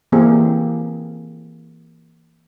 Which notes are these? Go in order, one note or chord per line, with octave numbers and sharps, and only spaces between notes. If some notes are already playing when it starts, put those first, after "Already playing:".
E3 A#3 C4 G4 G#4